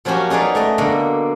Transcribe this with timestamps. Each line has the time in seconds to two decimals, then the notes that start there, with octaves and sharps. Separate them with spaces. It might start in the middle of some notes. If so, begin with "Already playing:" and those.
0.05 F3 F#3 A#3 C#4 F#4 G4
0.30 C#4 D#4 G#4 B4 D5
0.55 A3 D5 D#5
0.78 B2 D3 A#3